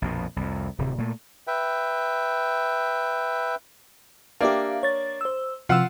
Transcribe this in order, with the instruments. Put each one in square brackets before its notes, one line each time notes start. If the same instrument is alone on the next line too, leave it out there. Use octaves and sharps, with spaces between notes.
[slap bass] A#1 F2 B2
C2 F2
D1 C3
A#2 A3
[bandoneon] B4 E5 G5
[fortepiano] A#3 D4 [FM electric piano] G4 E5 F5
[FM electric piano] C#5 A6
C5 E6
[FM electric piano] C3 F3 E6 [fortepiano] F4 F5 F#5